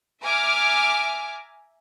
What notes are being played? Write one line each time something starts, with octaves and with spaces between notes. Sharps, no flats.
E5 G#5 A#5 D6 F6